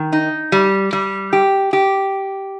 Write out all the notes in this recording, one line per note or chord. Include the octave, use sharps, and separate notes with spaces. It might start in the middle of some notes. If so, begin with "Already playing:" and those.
Already playing: D#3
D#4
G3
G3
G4
G4